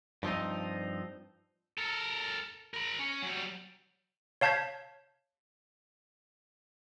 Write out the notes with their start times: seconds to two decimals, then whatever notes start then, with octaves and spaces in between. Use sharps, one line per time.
0.23 G2 F3 C4 D#4
1.78 A4 A#4
2.74 A#4 B5
2.99 C#4
3.23 F#3 G3
4.41 C#5 F5 A5 G6 G#6 B6